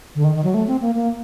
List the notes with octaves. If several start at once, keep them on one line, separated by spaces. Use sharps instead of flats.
D3
D#3
D#3
F#3
A3
C4
A#3
A#3